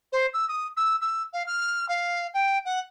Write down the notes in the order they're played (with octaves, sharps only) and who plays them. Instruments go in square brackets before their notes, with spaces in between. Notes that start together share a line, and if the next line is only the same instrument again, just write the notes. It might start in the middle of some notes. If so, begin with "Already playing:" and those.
[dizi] C5
E6
D#6
E6
E6
F5
F6
F5
G5
F#5